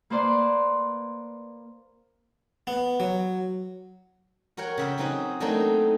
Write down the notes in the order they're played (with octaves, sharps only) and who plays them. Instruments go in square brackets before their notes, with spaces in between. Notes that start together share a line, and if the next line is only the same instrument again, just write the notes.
[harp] A#3 B4 C5 D5 C6
[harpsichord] B3
F#3
[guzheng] F#4 A#4 C#5 G5
C#3 E5 G5
F#3 C4 D#4 F#4 G#4
F#3 A3 A#3 C4 D4 D#4